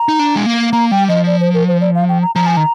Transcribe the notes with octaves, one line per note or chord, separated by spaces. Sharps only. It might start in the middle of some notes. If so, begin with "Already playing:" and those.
Already playing: A#5
D#4
D4
G#3
A#3
A#3 A#5
G3 G5
F3 D#5
D5
C5
A#4
C5
D5
F5
G5
A#5
F3 A#5
G#5
D#3 A#5